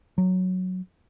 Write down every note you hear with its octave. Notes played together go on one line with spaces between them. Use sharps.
F#3